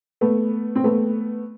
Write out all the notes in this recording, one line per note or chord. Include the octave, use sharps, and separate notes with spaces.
A3 B3
C4
A3 B3